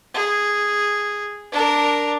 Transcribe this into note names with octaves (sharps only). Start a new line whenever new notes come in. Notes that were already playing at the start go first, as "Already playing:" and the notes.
G#4
D4 A#4